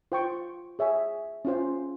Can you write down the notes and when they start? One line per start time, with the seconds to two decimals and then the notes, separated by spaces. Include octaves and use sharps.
0.12 F4 C5 G5 C#6
0.79 G#4 C#5 E5 G#5
1.45 C#4 F4 C5